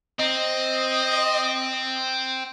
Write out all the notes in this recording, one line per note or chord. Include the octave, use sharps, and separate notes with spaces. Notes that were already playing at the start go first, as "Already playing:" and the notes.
C4 D#5